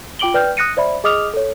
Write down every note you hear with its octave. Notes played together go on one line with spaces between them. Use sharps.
F4 G5 D6 D7 F#7 G7
B4 D5 G5 F6 G6
D#6 F#6 A#6 C#7 D#7
C5 D5 E5 B5
G#4 D#5 D6 D#6 F6 F7
A4 C#5